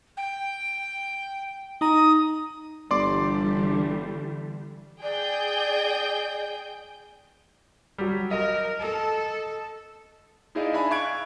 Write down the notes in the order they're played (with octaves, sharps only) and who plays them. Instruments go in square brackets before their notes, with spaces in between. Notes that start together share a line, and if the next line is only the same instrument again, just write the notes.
[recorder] G5
[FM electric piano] D#4 A#5 [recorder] D#6
[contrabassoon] G1 [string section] D3 E3 G3 [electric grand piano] D5 C6 D6
[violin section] G#4 G5 G6 [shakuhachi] D5
[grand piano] F#3 G3
[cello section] A#4 [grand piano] D#5
[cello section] A4
[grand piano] D#4 E4 G#4 D5 D#5 F5
D4 E5 G#5 B5
E5 F5 C#6 F#6 G#6 D7